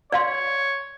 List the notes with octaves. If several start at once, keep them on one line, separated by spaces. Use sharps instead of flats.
C#5 D5 F5 C6